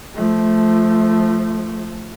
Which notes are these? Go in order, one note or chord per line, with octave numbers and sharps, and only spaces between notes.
F3 A3